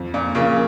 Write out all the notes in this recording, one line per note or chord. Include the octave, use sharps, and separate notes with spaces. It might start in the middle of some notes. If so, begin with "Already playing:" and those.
Already playing: F2
A#2
C#3 F3 A#3 F4